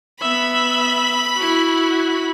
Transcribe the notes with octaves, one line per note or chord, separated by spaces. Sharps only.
B3 E5 B5
E4 F#4